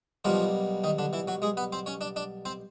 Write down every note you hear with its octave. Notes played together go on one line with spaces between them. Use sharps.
B1 B2 F3 G3 A#3 F4
D#3 D#4
D3 D4
E3 E4
F#3 F#4
G#3 G#4
B3 B4
C4 C5
C#4 C#5
D4 D5
D4 D5
C4 C5